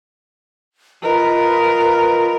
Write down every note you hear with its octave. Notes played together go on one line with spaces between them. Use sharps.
F4 A#4 B4 D#5